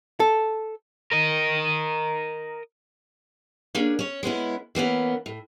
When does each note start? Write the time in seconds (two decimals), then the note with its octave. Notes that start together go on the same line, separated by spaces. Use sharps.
0.20 A4
1.11 A#4 D#5
3.75 A#3 C#4 D4 G#4
3.99 C#4 C#5
4.23 G#3 B3 C#4 E4
4.75 E3 A#3 B3 C#4
5.26 A2